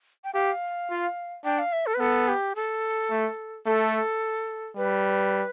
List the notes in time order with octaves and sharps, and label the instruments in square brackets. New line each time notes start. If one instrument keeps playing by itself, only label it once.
[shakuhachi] G5
[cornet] G4 [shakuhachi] F5
[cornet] F4
[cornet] D4 [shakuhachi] G5
[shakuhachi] F5
E5
A4
B4
[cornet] B3 [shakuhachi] A4
[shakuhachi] G4
A4
[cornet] A3
[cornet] A3 [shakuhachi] A4
[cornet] G3 [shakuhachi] B4